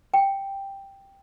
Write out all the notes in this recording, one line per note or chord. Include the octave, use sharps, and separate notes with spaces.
G5